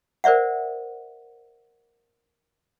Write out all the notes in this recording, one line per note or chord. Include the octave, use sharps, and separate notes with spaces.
A#4 C5 D5 E5 F#5